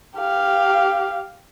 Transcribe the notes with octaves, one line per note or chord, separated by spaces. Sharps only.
G4 F5